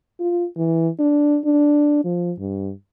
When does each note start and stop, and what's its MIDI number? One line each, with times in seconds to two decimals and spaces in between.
0.20 0.46 65
0.57 0.88 52
0.99 1.38 62
1.45 2.03 62
2.04 2.32 53
2.39 2.71 43